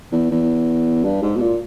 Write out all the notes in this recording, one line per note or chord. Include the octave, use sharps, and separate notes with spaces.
E2
E2
G2
G#2
B2
A#2